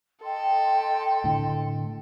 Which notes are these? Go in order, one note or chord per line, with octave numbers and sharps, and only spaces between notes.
A4 D#5 G5 C6
A2 D3